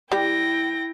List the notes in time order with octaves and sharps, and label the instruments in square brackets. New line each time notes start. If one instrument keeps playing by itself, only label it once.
[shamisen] G3 G4 [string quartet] E4 G5 A#6